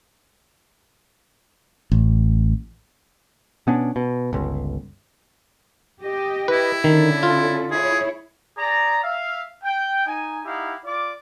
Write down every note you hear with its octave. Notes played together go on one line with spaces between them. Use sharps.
A1
B2 B3 C#4 D4
B2
G1 C#2
G4 D#5
E4 B4
D3 D#3 C#4 A4
F4
E4 G#4 C#5
G#4 D5 A#5
E5 F5
G5
D#4 G#5
D#4 E4 G4 F5 F#5
F4 D5 D6